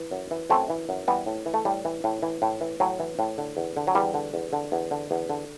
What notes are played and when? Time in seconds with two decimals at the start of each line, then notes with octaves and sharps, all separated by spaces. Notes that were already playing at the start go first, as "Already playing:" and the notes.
Already playing: E3
0.11 F#2
0.31 E3
0.50 F#2 A3 C4
0.70 E3
0.89 F#2
1.08 E3 G3 B3
1.26 A2
1.46 E3
1.54 A3
1.65 A2 G3
1.85 E3
2.04 A2
2.23 E3
2.42 A2
2.61 E3
2.80 A2 F#3
3.00 E3
3.19 A2
3.38 D3
3.57 E2
3.77 D3
3.87 F#3
3.95 E2 G3
4.14 D3
4.34 E2
4.53 D3
4.72 E2
4.91 D3
5.11 E2
5.30 D3